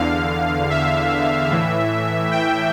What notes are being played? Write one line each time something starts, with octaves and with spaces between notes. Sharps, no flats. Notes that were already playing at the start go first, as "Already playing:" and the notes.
Already playing: E2 D3 F5
E5
A2 E3
G5